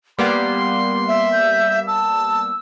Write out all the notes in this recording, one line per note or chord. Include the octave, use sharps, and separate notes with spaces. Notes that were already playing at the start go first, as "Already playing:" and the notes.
G3 A#3 B3 C6
E5
G6
A5 E6